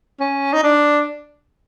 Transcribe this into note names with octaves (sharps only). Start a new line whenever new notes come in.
C#4
D#4
D4